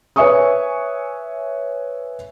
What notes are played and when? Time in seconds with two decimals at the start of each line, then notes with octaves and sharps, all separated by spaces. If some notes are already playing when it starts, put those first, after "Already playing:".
0.16 B4 C#5 E5 G#5 C#6 D#6